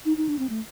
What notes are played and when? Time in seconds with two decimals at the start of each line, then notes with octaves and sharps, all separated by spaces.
0.05 D#4
0.17 D#4
0.29 D4
0.39 C4
0.50 A3